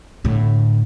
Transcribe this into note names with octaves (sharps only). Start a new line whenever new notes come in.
A2 D3